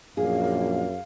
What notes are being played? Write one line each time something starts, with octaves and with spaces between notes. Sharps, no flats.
A#1 F#2 G#4 F5